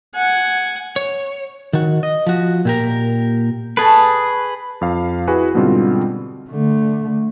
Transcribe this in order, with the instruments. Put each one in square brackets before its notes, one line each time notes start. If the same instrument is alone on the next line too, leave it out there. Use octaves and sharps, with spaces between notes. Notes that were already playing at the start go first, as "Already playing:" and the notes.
[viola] F#5 G#5
[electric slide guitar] C#5
D#3 F#4
D#5
F3 F#4
A#2 G4 A#4
[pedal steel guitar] G#4 B4 [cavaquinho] A4 A5 C#6
[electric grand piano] F2 F5
E4 F#4 G#4 B4 G#5
G#2 B2 D3 G3 C4 F4
[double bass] D3 A3